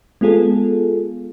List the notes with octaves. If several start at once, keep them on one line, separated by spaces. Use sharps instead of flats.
G#3 B3 F4 G#4 A4